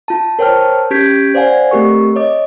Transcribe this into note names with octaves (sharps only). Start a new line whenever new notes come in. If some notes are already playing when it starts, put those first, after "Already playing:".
F4 A5
A#4 C5 C#5 G5 A5 F6
C#4 G4 G6 G#6 B6 D7
C5 D5 F5 F#5 G#5
A3 C4 G4 A#4 C#6
C#5 D#5 D6